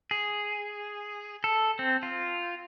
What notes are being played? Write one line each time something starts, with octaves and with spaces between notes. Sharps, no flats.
G#4
A4
C4
F4